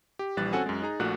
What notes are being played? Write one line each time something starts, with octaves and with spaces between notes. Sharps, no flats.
G4
A#1 E3 G3 F#6 A6
C4 C#4 F#4 A4 F#5 G#5
F#2 G#3
D#4 G#4 A#5
A#1 A#2 A3 F#4 F#6